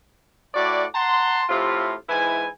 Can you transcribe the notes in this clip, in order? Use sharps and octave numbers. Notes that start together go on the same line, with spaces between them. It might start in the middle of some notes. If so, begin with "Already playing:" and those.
A2 F#4 D5
F#5 A5 A#5 C6
A2 C3 F4
G#2 E3 E4 G#5